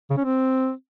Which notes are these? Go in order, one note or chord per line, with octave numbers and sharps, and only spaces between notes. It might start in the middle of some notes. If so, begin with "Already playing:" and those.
C#3
C#4
C4